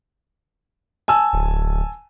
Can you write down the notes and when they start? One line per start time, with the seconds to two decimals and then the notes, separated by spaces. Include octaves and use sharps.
1.08 G#5 A5 E6
1.33 D1